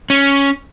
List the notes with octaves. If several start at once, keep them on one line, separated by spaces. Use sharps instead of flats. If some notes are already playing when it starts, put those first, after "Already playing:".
C#4